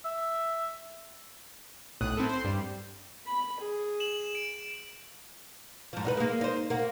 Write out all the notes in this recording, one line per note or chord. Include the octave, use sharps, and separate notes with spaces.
E5
B1 A2 D#6 F#6
C4 E4 A4
C5 C6
G2 G3
B5
G#4
E7 F#7
D7
G#2 F3
D#4 F4 B4
G#3 A#3
D#4 C5
A#3 F#4